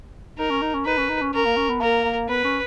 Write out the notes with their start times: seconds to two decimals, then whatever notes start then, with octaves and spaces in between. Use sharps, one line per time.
0.38 D#4 A#4
0.51 C#4
0.62 D#4
0.74 C#4
0.86 D#4 B4
0.98 C#4
1.09 D#4
1.22 C#4
1.34 C#4 A#4
1.45 A#3
1.57 C#4
1.69 B3
1.81 A#3 A#4
2.05 A#3
2.28 B3 B4
2.44 C#4